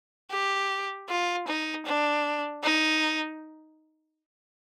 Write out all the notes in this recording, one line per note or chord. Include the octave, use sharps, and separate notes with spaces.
G4
F4
D#4
D4
D#4